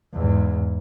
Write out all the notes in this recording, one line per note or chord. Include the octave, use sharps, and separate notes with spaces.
E2 G#2